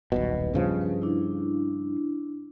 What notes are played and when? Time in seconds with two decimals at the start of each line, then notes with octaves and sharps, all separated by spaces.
0.12 D#1 B1 B2
0.54 G2 C#3 F3
0.81 B4
1.02 D4 E4